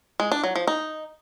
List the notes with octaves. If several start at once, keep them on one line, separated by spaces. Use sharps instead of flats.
G#3
D4
F#3
F3
D#4